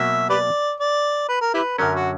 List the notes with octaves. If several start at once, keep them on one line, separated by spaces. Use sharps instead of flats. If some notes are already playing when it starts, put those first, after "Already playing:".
Already playing: B2 F#3 A#3 E5
G4 B4 D5
D5
B4
A#4
E4 G4 B4
F#2 D3 F#3 C#4 A#4
F#4